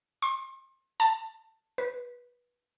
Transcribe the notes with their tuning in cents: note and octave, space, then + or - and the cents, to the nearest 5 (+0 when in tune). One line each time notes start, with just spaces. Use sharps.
C6 +35
A5 +15
B4 -20